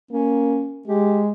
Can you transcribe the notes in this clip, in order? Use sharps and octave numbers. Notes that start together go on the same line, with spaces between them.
A#3 C#4
G#3 G4